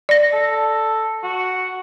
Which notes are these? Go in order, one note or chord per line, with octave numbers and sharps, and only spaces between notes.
D5 A#6
A4
F#4